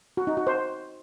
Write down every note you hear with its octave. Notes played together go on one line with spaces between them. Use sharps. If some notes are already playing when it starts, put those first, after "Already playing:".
F#4
D#4
F#4
C5